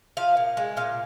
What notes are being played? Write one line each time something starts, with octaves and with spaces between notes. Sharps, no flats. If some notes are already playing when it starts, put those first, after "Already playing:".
F3 F5
A#2
G#3
A#2 F5